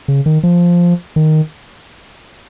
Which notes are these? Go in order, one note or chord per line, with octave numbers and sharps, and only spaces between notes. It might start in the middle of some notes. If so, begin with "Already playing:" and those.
C#3
D#3
F3
D#3